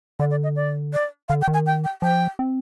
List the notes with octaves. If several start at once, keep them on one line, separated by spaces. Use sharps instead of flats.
D3 D5
D5
D#5
D5
D5
D3 F5
G5
D#3
G#5
G5
G5
F3 G5
C4